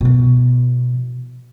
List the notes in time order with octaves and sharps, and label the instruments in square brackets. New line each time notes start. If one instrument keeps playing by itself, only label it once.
[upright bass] B2 E3